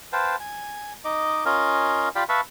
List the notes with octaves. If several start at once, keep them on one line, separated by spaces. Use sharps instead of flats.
B4 C5 F5 G5 A5
G#5
D#4 D#5 D6
C#4 F4 A#4 D#5 F5 G#5
F4 G4 D5 F5 G5 B5
B4 E5 F5 A5 B5 C#6